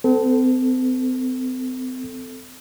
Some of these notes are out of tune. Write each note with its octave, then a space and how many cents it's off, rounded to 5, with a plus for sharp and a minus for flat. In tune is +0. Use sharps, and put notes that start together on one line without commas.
C4 -40 A4 +0